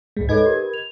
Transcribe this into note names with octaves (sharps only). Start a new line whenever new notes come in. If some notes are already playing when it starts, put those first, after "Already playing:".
C#2 G#2 G#3
D#4 A4 B4 C#5 D#5 G#6
G4 A#4
F7